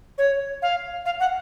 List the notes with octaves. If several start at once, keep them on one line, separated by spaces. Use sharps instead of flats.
C#5
F5
F5
F#5